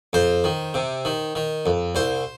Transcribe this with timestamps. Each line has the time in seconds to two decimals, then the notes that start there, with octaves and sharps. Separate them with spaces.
0.13 F2 C5
0.44 D#3
0.74 C3
1.05 D#3
1.35 D#3
1.66 F2
1.95 C2 C5